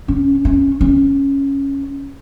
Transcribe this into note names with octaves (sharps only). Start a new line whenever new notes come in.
C#4
C#4
C#4